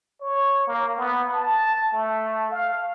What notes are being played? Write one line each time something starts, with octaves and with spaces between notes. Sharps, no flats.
C#5
A#3
B3
A5
A3
F5